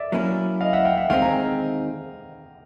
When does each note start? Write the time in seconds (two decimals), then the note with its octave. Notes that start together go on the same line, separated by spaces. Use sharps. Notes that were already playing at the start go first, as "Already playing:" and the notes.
Already playing: D5 E5
0.12 F#3 A#3 C#4 E4
0.61 D#5 F5
0.73 E5 F#5
0.85 F5 G5
0.97 E5 F#5
1.10 D#3 G#3 C4 D#4 F5 G5
1.22 G#5 A#5